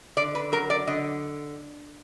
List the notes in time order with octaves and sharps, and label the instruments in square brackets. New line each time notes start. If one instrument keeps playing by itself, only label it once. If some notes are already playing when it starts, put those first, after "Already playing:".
[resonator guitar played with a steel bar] D3 D5
B4
F#3 A#4
D5
D3 D#5